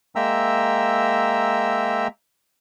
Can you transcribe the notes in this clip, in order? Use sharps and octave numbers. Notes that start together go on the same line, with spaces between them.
G#3 A#3 E5 G5 A#5 E6